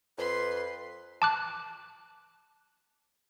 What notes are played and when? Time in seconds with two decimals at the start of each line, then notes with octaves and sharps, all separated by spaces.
0.18 F2 B4 C6
1.22 A5 D6 F#6